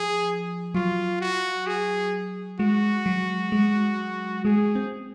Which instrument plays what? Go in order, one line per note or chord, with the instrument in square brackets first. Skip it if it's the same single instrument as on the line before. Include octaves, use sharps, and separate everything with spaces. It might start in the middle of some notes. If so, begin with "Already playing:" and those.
Already playing: [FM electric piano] F3 [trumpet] G#4
[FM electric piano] F#3 [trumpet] F4
[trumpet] F#4
G#4
[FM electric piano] G#3 [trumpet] F#4
[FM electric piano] F#3
G#3
[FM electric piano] G#3 [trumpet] G#4
[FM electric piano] C4